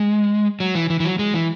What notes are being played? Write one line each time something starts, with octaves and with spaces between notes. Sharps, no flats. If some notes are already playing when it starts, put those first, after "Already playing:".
Already playing: G#3
F#3
E3
E3
E3
F#3
G#3
E3